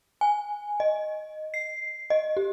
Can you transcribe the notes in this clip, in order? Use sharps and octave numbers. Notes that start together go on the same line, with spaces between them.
G#5
D#5
C7
D#5
G4